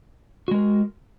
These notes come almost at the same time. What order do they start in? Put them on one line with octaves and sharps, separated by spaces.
F#4 G#3 A#4